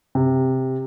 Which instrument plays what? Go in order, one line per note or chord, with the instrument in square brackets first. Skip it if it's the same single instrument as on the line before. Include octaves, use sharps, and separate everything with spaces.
[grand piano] C3